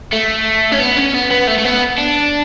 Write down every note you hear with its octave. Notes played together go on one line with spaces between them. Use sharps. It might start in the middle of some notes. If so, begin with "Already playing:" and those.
A3
C#4
B3
C#4
B3
B3
A3
A3
B3
D4